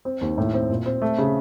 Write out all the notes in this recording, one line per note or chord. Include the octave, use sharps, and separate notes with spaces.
C4
D#2
A2
C4
A#2
C4
A3
C#3